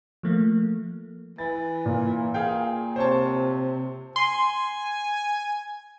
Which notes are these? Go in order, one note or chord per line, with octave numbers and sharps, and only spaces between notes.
F3 A3 A#3
E3 A6
A#2
G#4 F5 G5
C3 C5 C#5 A5
G#5 C6